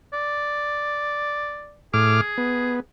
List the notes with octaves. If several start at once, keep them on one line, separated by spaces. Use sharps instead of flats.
D5
A2 G#4 D6 F6
B3